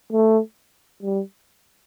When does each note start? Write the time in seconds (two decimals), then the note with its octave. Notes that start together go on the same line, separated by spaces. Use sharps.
0.12 A3
1.03 G3